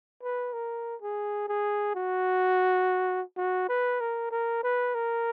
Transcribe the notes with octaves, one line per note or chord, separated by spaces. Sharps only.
B4
A#4
G#4
G#4
F#4
F#4
B4
A#4
A#4
B4
A#4